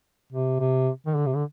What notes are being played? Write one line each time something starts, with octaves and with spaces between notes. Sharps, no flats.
C3
C3
D#3
D3
C3
D3